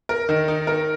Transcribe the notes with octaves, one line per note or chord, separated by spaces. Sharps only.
A#4
D#3
D#4
A#4